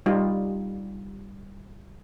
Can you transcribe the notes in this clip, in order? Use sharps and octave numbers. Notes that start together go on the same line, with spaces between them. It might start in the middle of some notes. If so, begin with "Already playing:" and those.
G3 D#4 F4